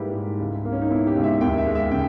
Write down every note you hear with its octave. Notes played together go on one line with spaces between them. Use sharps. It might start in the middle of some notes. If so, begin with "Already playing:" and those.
Already playing: G#2 G3 A#3 E4 G4 B4
G#2
C#2
A#3
C#4
D#4
B2 E4
G4
C#2
E5
D#2 G5
E5
G#3
E5
C#3 G5